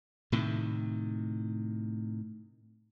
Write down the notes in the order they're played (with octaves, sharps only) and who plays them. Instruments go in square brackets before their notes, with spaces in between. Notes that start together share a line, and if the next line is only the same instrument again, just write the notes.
[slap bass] A2 C3 D#3